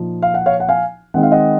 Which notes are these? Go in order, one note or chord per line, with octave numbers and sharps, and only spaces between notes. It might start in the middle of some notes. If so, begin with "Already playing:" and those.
Already playing: A#2 F3 D#4
F5
F#5
C#5 F5
F#5
F5 G#5
D#3 G#3 C4 D#4 F#5
F5
D#5 F#5